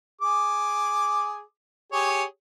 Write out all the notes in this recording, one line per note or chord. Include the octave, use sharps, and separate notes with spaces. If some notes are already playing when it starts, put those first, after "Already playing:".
G#4 D6
G4 G#4 C#5